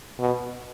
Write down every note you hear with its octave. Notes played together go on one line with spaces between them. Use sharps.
B2